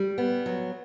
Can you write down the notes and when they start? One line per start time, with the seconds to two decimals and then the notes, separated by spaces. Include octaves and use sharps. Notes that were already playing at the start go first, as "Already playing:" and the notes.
Already playing: G3
0.18 B3
0.46 F#3